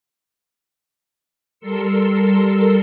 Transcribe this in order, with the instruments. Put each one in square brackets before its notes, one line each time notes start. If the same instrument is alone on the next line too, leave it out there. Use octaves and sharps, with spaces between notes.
[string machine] G3 A4 A#4 C6 E6 C#7